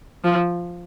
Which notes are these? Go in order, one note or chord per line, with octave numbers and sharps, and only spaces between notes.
F3